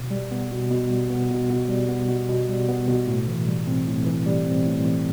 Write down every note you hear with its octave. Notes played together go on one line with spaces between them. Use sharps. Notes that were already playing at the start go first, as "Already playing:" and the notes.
Already playing: B2
G3
B3
B2
B2
G3
B3
B2
B2
G3
B3
B2
B2
G3
B3
B2
A2
E3
G3
C4
A2
E3
G3
C4
A2
E3